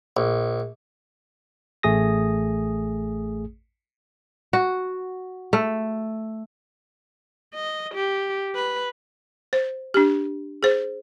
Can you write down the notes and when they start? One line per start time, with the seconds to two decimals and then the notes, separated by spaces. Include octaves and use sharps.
0.17 A#1
1.83 A1 A3 G#4 D#6 A#6
4.53 F#4
5.53 A3
7.54 D#5
7.94 G4
8.55 B4
9.53 C5
9.94 D4 G4
10.63 G#4 C5